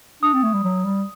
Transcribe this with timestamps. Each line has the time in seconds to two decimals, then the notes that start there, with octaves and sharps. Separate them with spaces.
0.23 D4 D#6
0.33 C4
0.43 A3
0.54 G3
0.64 F#3
0.85 G3